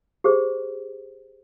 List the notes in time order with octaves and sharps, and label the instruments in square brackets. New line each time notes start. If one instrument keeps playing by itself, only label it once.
[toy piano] G4 G#4 C5